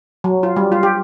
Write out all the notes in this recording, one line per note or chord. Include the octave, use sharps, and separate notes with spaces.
F#3
F4
G3
F4
G4